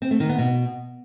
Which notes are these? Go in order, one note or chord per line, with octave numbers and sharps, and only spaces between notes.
C4
A3
D#3
B3
B2